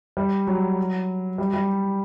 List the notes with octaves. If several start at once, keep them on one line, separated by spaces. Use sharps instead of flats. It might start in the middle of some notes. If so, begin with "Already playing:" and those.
G3
F#3
G3
G3